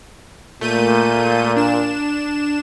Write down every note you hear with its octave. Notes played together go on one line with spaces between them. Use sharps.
A#2 A3 G6 D#7
D4 E7